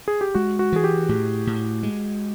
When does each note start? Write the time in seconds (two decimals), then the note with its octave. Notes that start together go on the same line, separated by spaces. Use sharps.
0.08 G#4
0.21 G4
0.35 G#3 F#4
0.59 F#4
0.72 E3 G#4
0.84 G4
1.09 A2 G4
1.47 A2
1.83 G#3